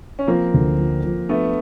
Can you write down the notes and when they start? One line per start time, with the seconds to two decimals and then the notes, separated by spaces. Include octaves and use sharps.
0.19 C#4
0.27 F3 A#3 C4
0.54 D2
0.78 F3
1.04 F3
1.29 A3 B3 D4